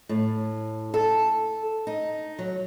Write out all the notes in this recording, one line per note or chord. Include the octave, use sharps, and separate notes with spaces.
A2
A4
D#4
F#3